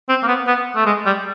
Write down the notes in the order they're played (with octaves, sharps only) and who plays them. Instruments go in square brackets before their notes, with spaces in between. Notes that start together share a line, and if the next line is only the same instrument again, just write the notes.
[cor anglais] C4
A#3
B3
B3
A3
G#3
G3